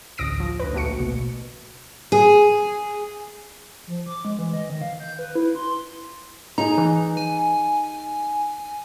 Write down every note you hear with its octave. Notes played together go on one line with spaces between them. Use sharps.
A1 D2 D#6 A#6 D7
F3
D2 B4
A#1 A3 A#3 F#4 C#7
B2
G#4
F3
D6
G#3
E3
D#5
D#3
F5
G6
B4
E4
C6
D#4 G#4 A#5
E3
G#5